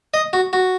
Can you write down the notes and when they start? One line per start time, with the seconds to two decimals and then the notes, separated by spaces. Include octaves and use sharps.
0.14 D#5
0.33 F#4
0.53 F#4